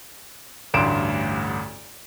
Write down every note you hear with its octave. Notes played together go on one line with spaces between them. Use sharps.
A1 D2 G2 C6 D7 E7